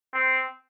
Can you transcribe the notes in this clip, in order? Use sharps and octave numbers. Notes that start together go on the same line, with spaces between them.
C4